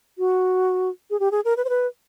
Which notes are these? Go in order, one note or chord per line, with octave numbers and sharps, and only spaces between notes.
F#4
G#4
G4
G#4
A#4
B4
C5
B4